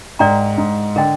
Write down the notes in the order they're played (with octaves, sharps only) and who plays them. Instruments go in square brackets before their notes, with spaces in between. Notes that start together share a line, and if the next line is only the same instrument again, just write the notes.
[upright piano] G#2 [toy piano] A#4 D5 G5 A#5
[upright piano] G#2
[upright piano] D3 [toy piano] A#4 D#5 G5